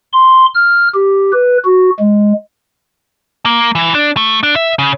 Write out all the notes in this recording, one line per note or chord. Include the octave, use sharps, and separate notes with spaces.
C6
F6
G4
B4
F#4
G#3
A#3
E3
D4
A3
D4
E5
C#3